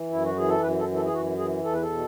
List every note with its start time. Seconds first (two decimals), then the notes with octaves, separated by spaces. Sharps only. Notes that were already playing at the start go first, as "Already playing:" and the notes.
Already playing: E3
0.10 F#2 E4
0.25 F#4
0.36 E3 G#4
0.49 A4
0.62 F#2 B4
0.80 A4
0.88 E3
0.96 A4
1.06 G#4
1.14 F#2 F#4
1.38 E3 G#4
1.64 E2 A4
1.73 B4
1.82 A4
1.91 B2